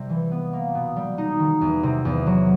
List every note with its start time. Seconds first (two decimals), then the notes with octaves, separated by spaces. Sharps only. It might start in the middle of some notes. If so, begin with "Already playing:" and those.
Already playing: C3 G3
0.10 E3
0.31 B3
0.53 A#3
0.75 B2
0.96 G3
1.18 D#4
1.40 D#3
1.61 E2
1.83 C3
2.05 E2
2.26 F#3